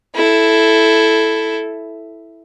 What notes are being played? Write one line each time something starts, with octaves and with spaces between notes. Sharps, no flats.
E4 A4